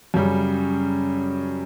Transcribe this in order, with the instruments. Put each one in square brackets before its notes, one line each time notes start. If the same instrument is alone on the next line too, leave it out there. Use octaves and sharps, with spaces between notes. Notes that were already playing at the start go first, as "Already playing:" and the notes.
[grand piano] F#2 C#3 G3